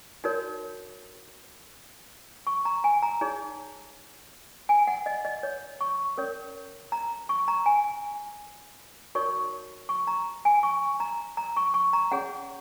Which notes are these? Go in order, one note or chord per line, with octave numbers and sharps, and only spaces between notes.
D#4 F#4 A#4 C#5
C#6
A#5
G#5
A#5
D#4 G#4 C#5
G#5
F#5
D#5
D#5
C#5
C#6
C#4 A#4 C#5
A#5
C#6
A#5
G#5
D#4 F#4 A#4 C#5 C#6
C#6
A#5
G#5
C#6
A#5
A#5
C#6
C#6
A#5
C#4 G#4 C#5 F#5